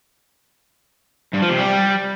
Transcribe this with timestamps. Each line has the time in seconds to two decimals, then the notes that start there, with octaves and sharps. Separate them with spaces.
1.34 G2
1.42 F3
1.50 C3
1.59 G3